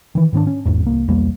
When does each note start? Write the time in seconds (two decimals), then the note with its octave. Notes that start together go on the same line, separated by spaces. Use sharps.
0.15 D#3 E3
0.33 G#2 D#3 B3 D4
0.47 C#4
0.66 G#1 E2 G#2
0.83 C2 A#3
1.08 B1 E2 G3 A#3